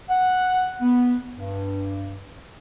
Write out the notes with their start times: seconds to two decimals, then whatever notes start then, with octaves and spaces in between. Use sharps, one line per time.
0.10 F#5
0.81 B3
1.36 G2